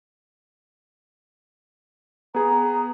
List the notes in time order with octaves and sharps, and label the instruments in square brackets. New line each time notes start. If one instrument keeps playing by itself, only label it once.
[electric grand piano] B3 G#4 [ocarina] A#5